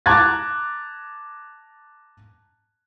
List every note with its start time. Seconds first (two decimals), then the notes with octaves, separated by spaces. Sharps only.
0.06 A5 A#5 D6 F#6 G#6 A6